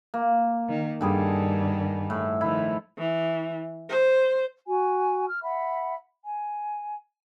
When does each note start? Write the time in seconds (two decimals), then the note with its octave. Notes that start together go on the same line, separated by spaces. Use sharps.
0.14 A#3
0.69 D#3
1.01 G2 D3 D#3 G3 G#4
2.10 A2
2.41 D#3 F3 E4
2.98 E3
3.89 C5
4.67 F#4 G#5
5.28 F6
5.43 E5 F#5 B5
6.25 G#5